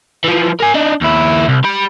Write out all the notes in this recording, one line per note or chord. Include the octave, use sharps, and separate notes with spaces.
E3 F3
A#4 G#5
D4 D#4
D#2 E4
C2
G4 B5